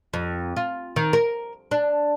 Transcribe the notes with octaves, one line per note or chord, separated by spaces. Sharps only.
F2
F4
D#3
A#4
D4